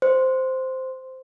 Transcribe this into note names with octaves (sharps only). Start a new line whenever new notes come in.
C5